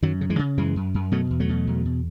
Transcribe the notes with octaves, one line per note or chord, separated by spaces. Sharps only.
F#2 D#3 F#3
C#3
E3 G#3
C#3
F#2 E3 G#3
F#2
F#2
B2 F#3 A3
E2
F#3 A3
B2
E2
B2